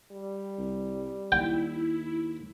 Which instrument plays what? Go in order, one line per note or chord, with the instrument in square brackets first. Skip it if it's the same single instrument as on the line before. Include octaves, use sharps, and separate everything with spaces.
[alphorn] G3
[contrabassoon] C2
[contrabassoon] D#2 [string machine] E4 [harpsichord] G5